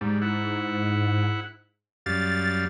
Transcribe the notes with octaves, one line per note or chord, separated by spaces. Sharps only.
G#2 G3
E4 F#5
F#2 G3 F5 A6